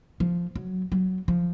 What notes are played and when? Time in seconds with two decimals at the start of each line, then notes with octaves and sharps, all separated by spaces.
0.20 F3
0.55 F#3
0.92 F#3
1.28 F3